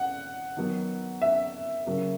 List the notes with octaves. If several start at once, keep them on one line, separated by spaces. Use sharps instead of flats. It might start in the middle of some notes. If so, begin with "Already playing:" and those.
Already playing: F#5
D#3 F#3 B3
E5
C#3 F#3 A#3